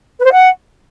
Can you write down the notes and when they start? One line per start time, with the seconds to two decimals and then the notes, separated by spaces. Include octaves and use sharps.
0.19 B4
0.26 C5
0.32 F#5